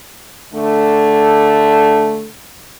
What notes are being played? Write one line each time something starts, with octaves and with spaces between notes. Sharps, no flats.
D3 A3